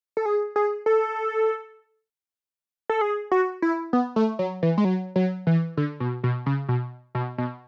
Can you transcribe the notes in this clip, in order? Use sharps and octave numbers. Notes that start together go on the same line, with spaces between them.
A4
G#4
G#4
A4
A4
G#4
F#4
E4
B3
A3
F#3
E3
G#3
F#3
F#3
E3
D3
B2
B2
C#3
B2
B2
B2